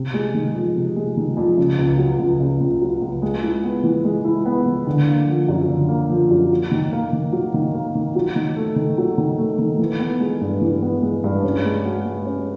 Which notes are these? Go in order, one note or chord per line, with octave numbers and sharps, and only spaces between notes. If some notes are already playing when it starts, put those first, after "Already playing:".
Already playing: C3
G#3
D#3
F2
C3
G#3
D#3
F2
C#3
C#2
F#3
C#2
C#3
C#2
F#3
C#2
G#3
E4
B3
E3
G#3
E4
B3
E3
D3
A#3
F3
F#2
D3
A#3
F3
F#2
F#3
D#3
A#3
D#3
F#3
D#3
A#3
D#3
F#3
D#3
A3
D#3
F#3
D#3
A3
D#3
E3
B3
G#3
G2
E3
B3
G#3
G2
C#4
G#3
F#4
G#3
C#4